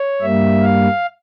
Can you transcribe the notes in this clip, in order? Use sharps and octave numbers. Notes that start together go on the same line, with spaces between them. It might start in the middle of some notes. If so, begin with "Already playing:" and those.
Already playing: C#5
G2 G3 A#3 E5
F5